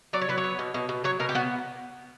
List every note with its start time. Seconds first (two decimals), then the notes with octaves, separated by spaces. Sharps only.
0.13 F#3 D5
0.21 C#5
0.29 F#3 B4
0.38 C#5
0.44 B3
0.59 B2
0.74 B2
0.89 B2
1.04 F#3 C#5
1.20 B2 A#4
1.29 G4
1.35 B3 F#4